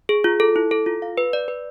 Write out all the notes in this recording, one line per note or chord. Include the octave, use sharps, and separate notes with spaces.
G#4
F4
A4
E4
A4
F4
F5
B4
D5
B4